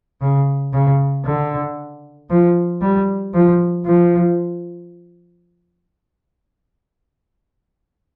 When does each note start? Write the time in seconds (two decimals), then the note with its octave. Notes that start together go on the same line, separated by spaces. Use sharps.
0.21 C#3
0.73 C#3
1.26 D3
2.30 F3
2.82 G3
3.34 F3
3.85 F3